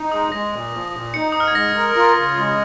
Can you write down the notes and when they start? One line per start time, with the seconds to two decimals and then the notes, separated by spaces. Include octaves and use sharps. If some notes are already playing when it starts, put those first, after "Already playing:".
Already playing: D#4
0.12 G#3 D#6
0.32 G#3 A#6
0.52 A#2
0.73 F3
0.93 A#2
1.14 D#4 C#7
1.32 G#2 D#6
1.40 F6
1.48 G#6
1.55 G#3 A#6
1.76 A#4
1.96 F4
2.17 C#3
2.37 G#3